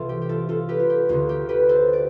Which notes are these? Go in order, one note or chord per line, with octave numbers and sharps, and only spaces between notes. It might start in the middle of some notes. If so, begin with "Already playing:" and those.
Already playing: C2 C3 E3 F4 A4
G4
G4
F4 A4
F4 A4
G4 B4
F4
G4
D2 D3 F4
G4
G4 B4
A4 C5
D5